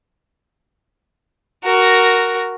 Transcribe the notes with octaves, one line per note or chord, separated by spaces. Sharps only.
F#4 A#4